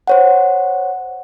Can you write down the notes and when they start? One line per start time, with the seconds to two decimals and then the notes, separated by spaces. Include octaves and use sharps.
0.07 C5 C#5 F#5